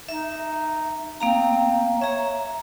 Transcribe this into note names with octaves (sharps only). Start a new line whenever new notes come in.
D#4 E5
A#3 C4 F5 A#5
C#5 E5 A#5